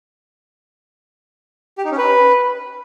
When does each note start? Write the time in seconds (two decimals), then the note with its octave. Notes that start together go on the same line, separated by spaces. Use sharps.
1.78 G4
1.85 D#4
1.91 C#4
1.98 B4